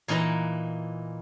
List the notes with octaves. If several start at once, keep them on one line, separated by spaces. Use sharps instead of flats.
A#2 E3 D#4 E4 B4 A#5